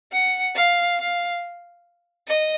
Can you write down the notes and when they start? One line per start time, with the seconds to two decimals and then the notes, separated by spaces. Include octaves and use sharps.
0.12 F#5
0.55 F5
0.98 F5
2.27 D#5